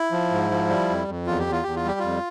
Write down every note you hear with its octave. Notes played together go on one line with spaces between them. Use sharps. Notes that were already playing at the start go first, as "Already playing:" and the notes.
Already playing: E4
F3
G#2
F3
G3
F2
F2
E2 F4
G4
E2
F4
E2 G4
F4
G3 G4
F2 F4